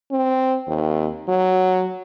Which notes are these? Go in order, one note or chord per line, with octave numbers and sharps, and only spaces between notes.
C4
D#2
F#3